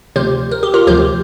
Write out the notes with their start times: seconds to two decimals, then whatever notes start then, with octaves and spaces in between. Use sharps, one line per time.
0.16 D2 C3 F3 G4 C5
0.51 A#4
0.63 G4
0.74 F4 A#4
0.87 D2 C3 F3 G4 C5